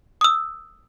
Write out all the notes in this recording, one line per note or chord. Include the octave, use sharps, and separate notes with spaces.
D#6 E6